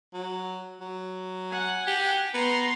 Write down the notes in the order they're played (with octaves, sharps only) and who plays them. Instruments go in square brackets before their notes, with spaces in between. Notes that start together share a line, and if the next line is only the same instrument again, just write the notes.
[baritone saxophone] F#3
F#3
[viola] F#5 G#5
[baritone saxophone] G4
[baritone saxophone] B3 [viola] A#5 C6